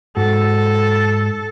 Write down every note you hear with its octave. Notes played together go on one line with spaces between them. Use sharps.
G#2 F#4 A4